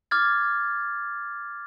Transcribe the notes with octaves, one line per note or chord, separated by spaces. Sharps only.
D6 F6 G#6 A6